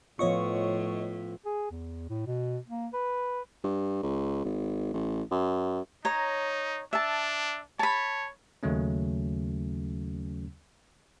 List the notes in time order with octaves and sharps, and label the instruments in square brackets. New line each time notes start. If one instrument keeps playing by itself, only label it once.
[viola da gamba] A2 [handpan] F3 B3 F4 [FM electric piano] C#5 D#5 C#6
[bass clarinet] G#4
E2
A2
B2
A#3
B4
[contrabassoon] G2
C#2
G#1
A1
F#2
[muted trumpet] D#4 [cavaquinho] C#5 A#5
[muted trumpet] D4 [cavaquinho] E5 A5
[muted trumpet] C#5 [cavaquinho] A5 B5
[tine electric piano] D#2 C#3 F#3 A3 C#4